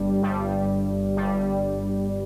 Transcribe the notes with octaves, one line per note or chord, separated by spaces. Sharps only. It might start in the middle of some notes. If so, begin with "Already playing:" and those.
Already playing: G1 G2 G3
G1 G2 G3
G1 G2 G3